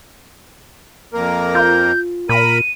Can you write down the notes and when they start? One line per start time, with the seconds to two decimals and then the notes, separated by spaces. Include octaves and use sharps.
1.14 F2 A#3 A#4
1.55 F4 G6
2.29 A#2 A#4 B5 D#7